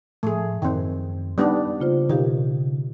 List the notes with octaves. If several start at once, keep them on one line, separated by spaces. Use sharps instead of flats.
A2 F3 A3 G#4
F#2 D#3 C4 G5 C6
G3 B3 D4 D#4 D5
C#3 A#3 F4 C5
B2 D#3 G4 F5